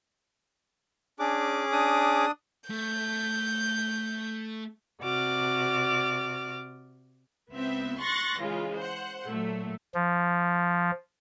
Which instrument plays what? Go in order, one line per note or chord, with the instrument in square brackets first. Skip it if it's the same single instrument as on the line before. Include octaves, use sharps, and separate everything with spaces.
[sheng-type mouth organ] C#4 G#4 D6 [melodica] D4
[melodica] D4 D#6
[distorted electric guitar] A3 [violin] G6
[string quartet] C3 F#4 D5 D6 F6
[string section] C#2 B3 C4 E5
C6 C#6 F#6 A6 A#6
C#3 E3 G#3 F4
C5 F#5
A#2 F#3 A3
[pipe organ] F3